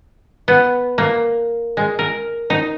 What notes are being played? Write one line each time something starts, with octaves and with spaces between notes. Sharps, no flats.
B3
A#3
G#3
A#4
D#4